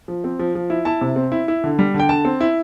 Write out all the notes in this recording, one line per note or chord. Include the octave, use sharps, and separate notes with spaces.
F3
C4
F3
F3
E4
E4 A5
C3
C4
E4
E4
D3
G3
D3
G5
D3 A5
C4
E4